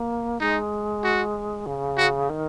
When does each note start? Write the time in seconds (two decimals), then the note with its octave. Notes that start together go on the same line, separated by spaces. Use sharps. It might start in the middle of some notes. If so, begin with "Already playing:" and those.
Already playing: A#3
0.40 G#3 D#4
1.04 F#4
1.66 C#3
1.98 F#4
2.29 D#3